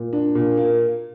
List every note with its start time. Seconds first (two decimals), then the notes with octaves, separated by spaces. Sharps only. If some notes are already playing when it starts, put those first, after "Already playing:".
Already playing: A#2
0.13 D4
0.35 A#2
0.57 A#3